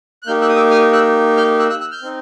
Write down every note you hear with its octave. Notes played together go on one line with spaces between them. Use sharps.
F#6
A#3 D#4 G4 F6 G6
E6 F#6
D#6
D6 E6
D#6 F6
E6 F#6
F6 G6
E6 F#6
E6 F#6
E6 F#6
F6 G6
C4 D#4